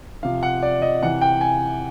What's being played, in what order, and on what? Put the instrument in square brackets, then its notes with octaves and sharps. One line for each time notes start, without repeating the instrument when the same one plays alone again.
[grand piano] C3 F3 F5
F#5
D5
D#5
C3 E3 F#5
G5
G#5